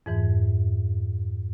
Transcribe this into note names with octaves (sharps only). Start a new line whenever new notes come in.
F2 G#2 E3